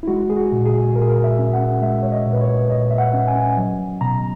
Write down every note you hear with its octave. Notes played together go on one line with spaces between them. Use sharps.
E4
G#3 F#4
G#4
F#4
A#2
G#4
A#2 A#4
G#4
A#4
E5
C#4
F#5
G#3 E5
C#5
D#5
A#2
B4
C#5
A#2 D#5
E5
F#5
C#4
G#5
F#3
B2 A#5